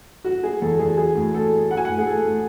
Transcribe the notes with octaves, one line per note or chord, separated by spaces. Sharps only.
F#3 F#4
F#3 G#4
E2 A4
E2 G#4
F#3 G#4
A2
A2 A4
A2
F#3 F#5
G#5
A2 F#5
G#4
A2 A4
A2